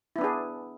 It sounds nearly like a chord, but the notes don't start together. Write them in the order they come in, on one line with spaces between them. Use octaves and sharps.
E4 B3 D4 G#4